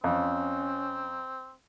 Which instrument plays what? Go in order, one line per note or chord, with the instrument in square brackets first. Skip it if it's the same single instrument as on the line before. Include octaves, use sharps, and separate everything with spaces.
[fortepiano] F2 [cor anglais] C4 [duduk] C#4